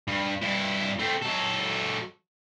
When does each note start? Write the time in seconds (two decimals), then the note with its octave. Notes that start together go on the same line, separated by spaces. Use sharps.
0.07 G2
0.43 G2 E4
0.99 A3 C4
1.22 F#3 A4